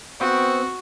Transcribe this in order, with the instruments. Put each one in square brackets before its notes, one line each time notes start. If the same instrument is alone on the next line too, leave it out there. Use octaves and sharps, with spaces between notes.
[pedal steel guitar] B3 C4 G5 [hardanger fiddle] F#4